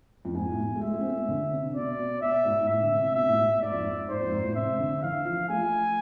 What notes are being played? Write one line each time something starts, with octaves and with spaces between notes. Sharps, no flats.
F2
G#2 G#5
A2
B2
A3
G#3 E5
A3
C4
B3
B3
D3
C3
C3
B2 D5
B2
B2 E5
G#2
G#2
A2 E5
D3
C3
B2 E5
A2
G#2
G#2 D5
F2
G#2
G#2 C5
F2
G#2
A2
C3 E5
D3
E3 F5
F3
A3 G#5